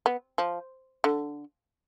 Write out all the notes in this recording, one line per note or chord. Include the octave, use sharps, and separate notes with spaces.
B3
F3
D3